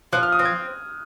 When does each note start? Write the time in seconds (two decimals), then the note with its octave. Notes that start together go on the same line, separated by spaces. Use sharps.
0.13 F3 F#6
0.23 F6
0.32 D#6
0.39 C4
0.45 G#6